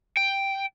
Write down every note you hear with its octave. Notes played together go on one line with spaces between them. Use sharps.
G5